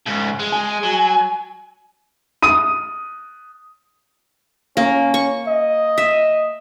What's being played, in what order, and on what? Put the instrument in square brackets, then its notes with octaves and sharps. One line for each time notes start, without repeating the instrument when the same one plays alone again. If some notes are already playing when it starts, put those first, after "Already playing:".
[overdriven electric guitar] G#2 C#3
G#3
[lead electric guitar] G#5
[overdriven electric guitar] F#3
[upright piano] D#6 D#7
[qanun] A#3 [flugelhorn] C#4
[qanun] C#6
[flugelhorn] D#5
[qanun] E5